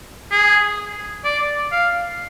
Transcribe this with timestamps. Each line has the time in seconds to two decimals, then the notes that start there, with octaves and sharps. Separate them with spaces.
0.31 G#4
1.24 D5
1.72 F5